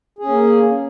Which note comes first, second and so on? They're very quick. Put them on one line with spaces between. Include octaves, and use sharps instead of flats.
G#4 C#4 A#3